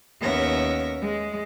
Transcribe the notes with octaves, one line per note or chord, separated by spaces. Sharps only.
D#2 B3 C#4 A#4 E5 A#6
G#3